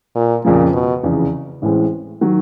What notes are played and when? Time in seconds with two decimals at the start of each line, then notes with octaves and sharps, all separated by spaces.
0.15 A#2
0.45 F2 A#2 C#3 F3
0.73 B2
1.03 F1 E2 C#3
1.62 A1 A2 E3 G#3 C4
2.21 D#3 F#3